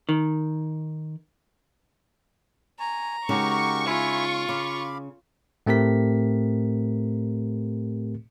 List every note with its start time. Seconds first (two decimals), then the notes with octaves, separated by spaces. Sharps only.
0.09 D#3
2.80 G#5 A#5 C#6
3.29 C#3 G#3 D#4 F#4 G4 A#4 C#6
3.86 E4 F4 E5 G#5
4.49 C#3 F5 B5 D6
5.66 A2 A3 C4 G4 A#4 B6